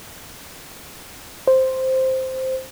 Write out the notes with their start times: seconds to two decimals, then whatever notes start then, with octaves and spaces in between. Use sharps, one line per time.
1.48 C5